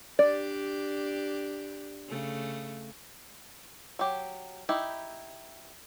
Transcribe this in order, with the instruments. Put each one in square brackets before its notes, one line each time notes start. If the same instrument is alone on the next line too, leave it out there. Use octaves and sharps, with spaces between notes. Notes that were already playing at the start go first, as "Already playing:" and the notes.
[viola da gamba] D4 G4 [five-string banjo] D5
[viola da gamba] C#3 A3
[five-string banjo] F#3 G4
D#4 E4 G4